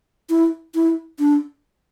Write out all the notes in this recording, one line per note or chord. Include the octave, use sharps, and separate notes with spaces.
E4
E4
D4